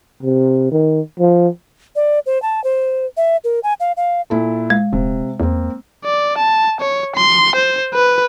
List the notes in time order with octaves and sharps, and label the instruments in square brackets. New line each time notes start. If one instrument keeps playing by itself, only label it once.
[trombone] C3
D#3
F3
[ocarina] D5
C5
A5
C5
E5
A#4
G#5
F5
F5
[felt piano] A#2 E4 A4
[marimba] G#3
[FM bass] D#1 [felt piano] C3
[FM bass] E2 [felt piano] A#3 C4
[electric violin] D5
A5
C#5
C6
C5
B4